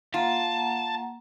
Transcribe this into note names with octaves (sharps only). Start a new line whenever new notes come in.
A#3 F4 F#5 A5 A#5